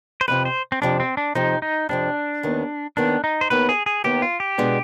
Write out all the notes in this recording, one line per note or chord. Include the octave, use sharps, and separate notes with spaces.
C5
F2 C3 F3 B4
C5
C4
F2 C3 F3 D4
C4
D4
F2 C3 F3 D#4
D#4
F2 C3 F3 D4
D#2 D#3 B3
D#2 D#3 B3 D4
D#4
C5
D#2 D#3 B3 B4
G#4
G#4
D#2 D#3 B3 G4
F4
G4
B2 G#3 B3 D4